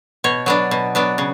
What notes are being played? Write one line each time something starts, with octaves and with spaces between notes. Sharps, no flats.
B2 C#5
F#3 B3 D4
B2
F#3 B3 D4
C#3